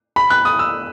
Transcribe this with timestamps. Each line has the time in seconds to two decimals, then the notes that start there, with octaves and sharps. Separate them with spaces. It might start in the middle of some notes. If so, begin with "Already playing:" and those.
0.16 B5
0.30 F#6
0.45 D#6
0.59 E6